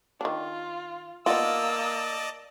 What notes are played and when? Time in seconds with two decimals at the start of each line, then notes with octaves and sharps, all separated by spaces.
0.21 D#3 D4 F4
1.26 A#3 B3 D#4 F4 D5 D#5 A5 E6